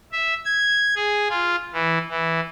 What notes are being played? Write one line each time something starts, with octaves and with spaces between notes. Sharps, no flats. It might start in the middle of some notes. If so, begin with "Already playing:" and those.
E5
G#6
G#4
F4
E3
E3